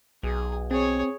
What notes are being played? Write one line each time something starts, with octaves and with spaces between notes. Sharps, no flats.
B1 G#4
C4 G#4 C#5